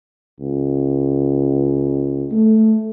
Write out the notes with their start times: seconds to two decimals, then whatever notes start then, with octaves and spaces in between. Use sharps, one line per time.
0.40 C#2
2.31 A3